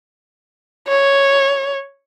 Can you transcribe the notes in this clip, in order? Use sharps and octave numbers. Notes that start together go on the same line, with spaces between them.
C#5